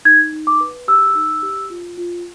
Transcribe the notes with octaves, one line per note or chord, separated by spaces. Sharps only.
D#4 G#6
D#4
D6
B4
G4 E6
D#4
G4
F4
F4